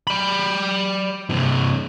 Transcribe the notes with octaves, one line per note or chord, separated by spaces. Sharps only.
D5 B5
G2 C3